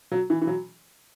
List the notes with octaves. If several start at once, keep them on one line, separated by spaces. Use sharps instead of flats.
F#3
E3
E3
F#3